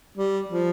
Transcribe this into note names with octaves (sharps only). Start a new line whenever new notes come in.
G3
F3